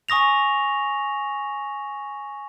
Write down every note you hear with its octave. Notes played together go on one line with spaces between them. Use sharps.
G#5 C#6 D#6 A#6 F7